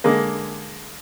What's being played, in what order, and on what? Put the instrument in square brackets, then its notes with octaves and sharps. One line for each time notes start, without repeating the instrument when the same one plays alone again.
[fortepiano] D3 G#3 A#3